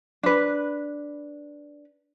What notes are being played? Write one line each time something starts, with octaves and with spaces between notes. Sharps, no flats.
D4 B4